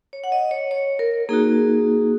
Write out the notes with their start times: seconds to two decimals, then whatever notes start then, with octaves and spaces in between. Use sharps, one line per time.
0.13 C#5
0.24 F#5
0.32 D#5
0.51 C#5
0.71 C#5
0.99 A#4
1.29 A#3 D#4 F#4 G#4